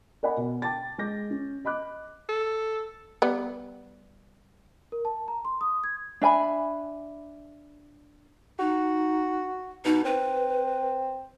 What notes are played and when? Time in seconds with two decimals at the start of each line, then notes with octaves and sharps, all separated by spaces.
0.23 A#4 D5 D#5 F#5 G#5 B5
0.37 B2
0.62 G5 A5 D6 A6
0.98 G#3 D6 G6 A#6
1.30 C#4
1.65 D#5 B5 D6 F#6
2.29 A4
3.22 G3 B3
4.92 A#4
5.05 A5
5.28 A#5
5.45 C6
5.61 D#6
5.84 G#6
6.21 D4 E5 G#5 B5
8.59 D#4 F#4
9.85 B2 D#4
10.05 C4 B4